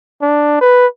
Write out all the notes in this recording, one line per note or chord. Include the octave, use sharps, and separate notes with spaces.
D4
B4